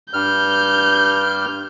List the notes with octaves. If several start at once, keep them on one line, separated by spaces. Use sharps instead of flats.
G2 F6 G6